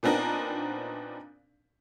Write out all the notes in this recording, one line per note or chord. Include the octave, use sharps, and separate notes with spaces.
A#2 B3 C4 D4 D#4 A#4